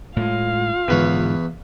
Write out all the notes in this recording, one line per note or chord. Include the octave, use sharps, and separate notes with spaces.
A2 G#3 F4 F5
E2 G#2 D3 D#3 B4 C#5